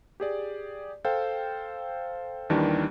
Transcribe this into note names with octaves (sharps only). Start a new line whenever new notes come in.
G4 G#4 D5
A4 C5 F5 G5
D#2 D#3 E3 G3 D4